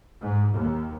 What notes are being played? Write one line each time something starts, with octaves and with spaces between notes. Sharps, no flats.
G#2
D#2